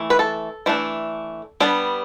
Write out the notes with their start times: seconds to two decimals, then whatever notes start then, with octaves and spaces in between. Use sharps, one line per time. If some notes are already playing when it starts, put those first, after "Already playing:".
Already playing: E3 A3
0.10 B4
0.19 A4
0.66 E3 A3 D4
1.60 G3 B3 D4